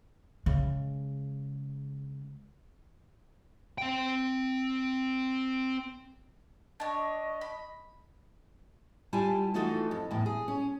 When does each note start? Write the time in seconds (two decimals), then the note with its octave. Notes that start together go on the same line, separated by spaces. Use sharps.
0.46 C#3 G#3
3.78 C4 G5
6.80 D4 C#5 D#5
7.41 B5
9.13 G3 E4 F4 G#5 A5
9.54 E3 A3 D#4 F4 F#4 A4
9.91 F2
10.11 E2 A2
10.26 G#4
10.48 C#4